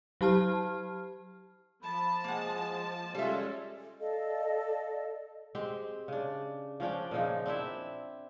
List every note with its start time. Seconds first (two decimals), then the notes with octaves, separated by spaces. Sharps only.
0.21 F#3 G4 A5 F6
1.83 F3 A5 B5
2.24 G#3 A#3 F#5
3.15 G3 G#3 C#4 F4 A4 E5
4.00 A4 D5 D#5 F5
5.55 G#3 C4 G4
6.08 C#3 D4
6.80 F3 C#4 D4 G5
7.11 A#2 C#3 F3 D#4
7.46 C4 D4 E4 E5